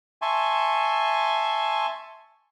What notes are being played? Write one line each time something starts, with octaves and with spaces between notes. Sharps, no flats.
E5 G#5 A5 C6 C#6